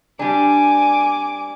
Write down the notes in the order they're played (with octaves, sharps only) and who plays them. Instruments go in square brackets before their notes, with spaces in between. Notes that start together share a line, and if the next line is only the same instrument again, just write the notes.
[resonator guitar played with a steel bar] G3 D4 [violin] G#5 D6